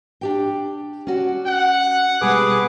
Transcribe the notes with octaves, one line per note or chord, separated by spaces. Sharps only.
D4 G4 G5
C#4 F#4 D5
F#5
B2 G3 G#3 G#4 B4 D6